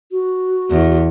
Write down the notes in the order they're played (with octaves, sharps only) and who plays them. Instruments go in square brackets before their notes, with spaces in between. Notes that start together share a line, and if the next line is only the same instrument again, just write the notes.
[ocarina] F#4
[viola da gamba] E2